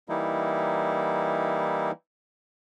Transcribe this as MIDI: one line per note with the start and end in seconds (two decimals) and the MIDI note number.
0.09 1.91 52
0.09 1.91 55
0.09 1.91 58
0.09 1.91 63
0.09 1.91 64